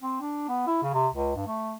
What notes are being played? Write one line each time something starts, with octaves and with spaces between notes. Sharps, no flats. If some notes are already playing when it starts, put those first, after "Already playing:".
C4
D4
B3
E4
C#3
C3
C#2
G2
A3